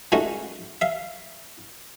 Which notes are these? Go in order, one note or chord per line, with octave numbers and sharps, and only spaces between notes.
A#2 G#3 A3 C#4 D#4 F#4
E5 F5